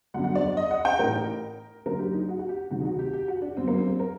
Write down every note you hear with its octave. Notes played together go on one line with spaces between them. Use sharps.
G1 F#2 D3 F#5
F#5
D5
D5
D#5
F#5
G5
A1 A2 A#4
F#1 F#2 D3 A#4
G4
D#4
F#4
F#4
G4
D2 C3 D#3 F#4
D#4
F#4
G4
G4
F#4
D4
G1 F#2 D3 C4
A#3
C4
C4
A#4